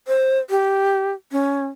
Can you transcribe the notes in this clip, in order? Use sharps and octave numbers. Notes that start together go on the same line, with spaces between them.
C5
G4
C#4